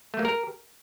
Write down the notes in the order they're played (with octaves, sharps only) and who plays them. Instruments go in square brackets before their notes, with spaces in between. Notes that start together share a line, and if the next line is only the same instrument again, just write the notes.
[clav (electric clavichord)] A3
A#3
A#4